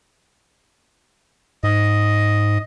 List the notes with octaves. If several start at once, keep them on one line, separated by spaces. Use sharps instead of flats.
G#2 D#5